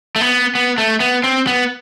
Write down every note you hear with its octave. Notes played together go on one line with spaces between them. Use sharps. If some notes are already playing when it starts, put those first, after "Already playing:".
A3
B3
B3
A3
B3
C4
B3